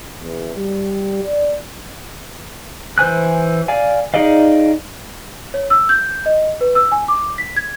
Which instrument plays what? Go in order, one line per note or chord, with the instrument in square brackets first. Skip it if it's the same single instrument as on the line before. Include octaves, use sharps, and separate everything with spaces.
[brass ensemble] E2
G3
D5
[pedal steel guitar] E3 C5 G#5 F#6
D5 F5 G#5
D#4 G#4 D5 D#5 F5
[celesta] C#5
E6
G6
D#5
B4
E6
G#5
D6
B6
G#6